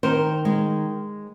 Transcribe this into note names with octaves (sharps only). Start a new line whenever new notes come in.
D#3 A#4 C5
G#3